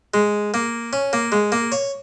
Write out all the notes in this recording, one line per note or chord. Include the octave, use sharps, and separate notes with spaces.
G#3
A#3
C#4
A#3
G#3
A#3
C#5